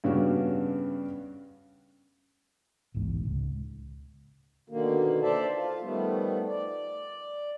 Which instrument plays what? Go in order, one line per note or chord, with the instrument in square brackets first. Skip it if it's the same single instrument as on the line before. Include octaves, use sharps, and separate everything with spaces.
[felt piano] G2 C#3 B3 C#4 D4 F#4
[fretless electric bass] D1 A1 G#2 B2
C#2
[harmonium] B2 D3 D#3 A#3
A4 C5 D5 E5 A5
F4
D#3 F3 G3 A3 B3
D5